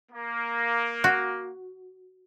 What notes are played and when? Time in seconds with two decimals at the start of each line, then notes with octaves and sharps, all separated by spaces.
0.11 A#3
1.04 F#4